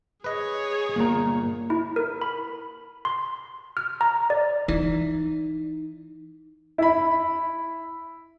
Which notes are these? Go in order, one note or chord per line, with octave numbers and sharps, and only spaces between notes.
G#4 B4 C#5 D#5
G1 A#2 A#3 A#5
E4
A#4
B5
C6
F6
A#5
D5
E3 D#4
E4 B5